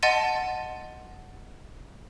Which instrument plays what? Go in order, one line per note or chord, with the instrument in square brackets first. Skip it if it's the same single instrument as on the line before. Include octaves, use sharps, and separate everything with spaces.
[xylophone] D#5 F#5 A5 C6 A6 D#7